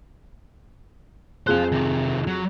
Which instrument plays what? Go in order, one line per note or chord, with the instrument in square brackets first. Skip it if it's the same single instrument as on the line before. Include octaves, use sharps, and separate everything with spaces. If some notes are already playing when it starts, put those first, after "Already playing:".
[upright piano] F2 G#4 F#6 [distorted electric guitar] C5 F5
[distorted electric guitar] C3 D#3
F#3